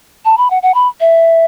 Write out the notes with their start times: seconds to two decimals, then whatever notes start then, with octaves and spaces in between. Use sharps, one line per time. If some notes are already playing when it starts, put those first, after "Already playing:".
0.25 A5
0.37 B5
0.50 F#5
0.63 F#5
0.74 B5
1.00 E5